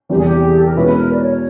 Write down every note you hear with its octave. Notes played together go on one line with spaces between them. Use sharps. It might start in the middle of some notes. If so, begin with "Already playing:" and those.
E2 C3 E3 G3 B3 G4
G#4
G4
G#4
A4
A#4
B2 G#3 C#4 E4 B4
A#4
D5
C#5